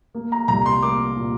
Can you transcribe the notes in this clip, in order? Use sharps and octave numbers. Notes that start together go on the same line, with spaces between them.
A#3
A#5
C2 A#5
C6
A#3 D6
A#2